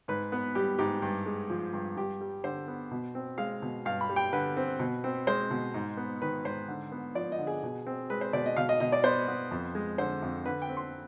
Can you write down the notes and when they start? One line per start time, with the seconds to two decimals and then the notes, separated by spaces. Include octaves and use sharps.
0.08 G#2 B4
0.32 B3
0.55 G3 G4
0.79 G#2 G4
1.02 G2
1.26 G#3
1.50 F3
1.73 G2
1.96 G2 G4
2.21 G3
2.44 D3 C5
2.68 B3
2.91 B2
3.15 C4
3.38 G#3 F5
3.62 B2
3.85 G2 F5
4.01 B5
4.09 G3
4.16 G5
4.33 D3 B4
4.57 C4
4.80 B2
5.04 C4
5.27 G#3 C5
5.51 B2
5.74 G#2
5.97 B3
6.22 D#3 B4
6.45 G#2 C5
6.68 D3
6.92 B3
7.15 F3 D5
7.32 D#5
7.39 D3
7.47 G#4
7.63 B2
7.87 C4
8.10 G#3 B4
8.21 C5
8.33 B2 D5
8.46 D#5
8.57 B2 F5
8.69 D#5
8.80 B2 D#5
8.92 D5
9.04 B3 C5
9.28 B3
9.51 F2
9.75 G#3
9.98 D3 C5
10.22 F2
10.46 D3 B4
10.62 G5
10.69 C4
10.77 C6